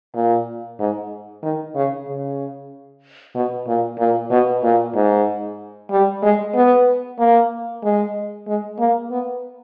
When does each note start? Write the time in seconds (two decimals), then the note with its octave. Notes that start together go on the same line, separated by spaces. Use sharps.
0.15 A#2
0.79 G#2
1.43 D#3
1.75 C#3
2.07 C#3
3.35 B2
3.67 A#2
3.99 A#2
4.31 B2
4.63 A#2
4.95 G#2
5.91 G3
6.23 G#3
6.55 B3
7.19 A#3
7.83 G#3
8.47 G#3
8.79 A#3
9.11 B3